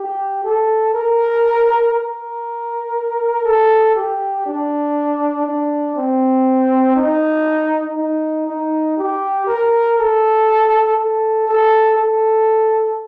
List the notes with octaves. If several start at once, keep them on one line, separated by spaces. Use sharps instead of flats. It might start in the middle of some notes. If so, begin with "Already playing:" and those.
Already playing: G4
A4
A#4
A#4
A4
G4
D4
D4
C4
D#4
D#4
D#4
G4
A#4
A4
A4
A4
A4